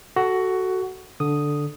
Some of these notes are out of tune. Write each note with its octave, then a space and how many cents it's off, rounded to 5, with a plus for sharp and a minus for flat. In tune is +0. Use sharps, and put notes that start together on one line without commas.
F#4 +10 A4 +0
D3 +0 D#6 +0